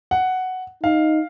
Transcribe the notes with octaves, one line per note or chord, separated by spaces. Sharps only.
F#5
D#4 F5